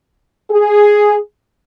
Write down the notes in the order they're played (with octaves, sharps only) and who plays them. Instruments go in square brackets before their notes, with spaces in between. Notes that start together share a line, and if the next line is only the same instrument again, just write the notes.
[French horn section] G#4